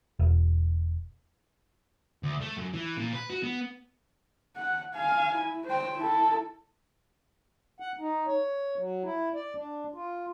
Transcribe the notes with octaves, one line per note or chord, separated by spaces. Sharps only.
E1
D2
A3
F#2
E3
A#2
B4
F#4
B3
F#5
F5 G#5
E4
C5 G5
E4 A4
F#5
D#4
C#5
F#3
E4
D5
D4
F4